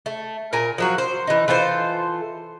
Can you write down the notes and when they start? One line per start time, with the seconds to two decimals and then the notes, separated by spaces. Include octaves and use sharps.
0.06 A3
0.53 A#2 A#4 G#5
0.78 F3 F#3 F#4
0.98 C5
1.27 E3 D#4
1.48 E3 F4 A4 C5